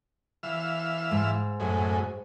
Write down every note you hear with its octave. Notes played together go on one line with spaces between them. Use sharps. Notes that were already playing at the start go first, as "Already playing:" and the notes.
E3 F5 E6
G#2
F#2 A2 G#3